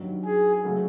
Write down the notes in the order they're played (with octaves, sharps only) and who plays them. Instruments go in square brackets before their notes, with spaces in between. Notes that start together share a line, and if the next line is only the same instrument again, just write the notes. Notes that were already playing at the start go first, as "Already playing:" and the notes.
Already playing: [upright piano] G2 D#3 F#3
[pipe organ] G#4
[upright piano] C#3 F#3 A3 C#4 F#4